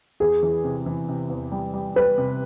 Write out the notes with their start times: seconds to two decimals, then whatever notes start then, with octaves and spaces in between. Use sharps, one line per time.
0.20 E2 G#4
0.43 E3
0.64 C3
0.86 E3
1.08 C3
1.30 E2
1.52 G3
1.74 G3
1.96 G3 B4
2.18 C3